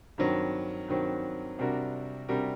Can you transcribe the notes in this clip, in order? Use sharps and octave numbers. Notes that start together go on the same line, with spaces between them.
G2 D#3 F#3 C4
G2 D#3 F#3 C4
C3 G3 D4 F#4 A#4
C3 G3 D4 F#4 A#4